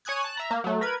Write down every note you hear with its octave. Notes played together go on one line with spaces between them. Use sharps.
C#5 G#5 D#6 F#6 G#6
A5 F#6
E5 A#5
A#3
F#3 A3
A#4 B4 G#6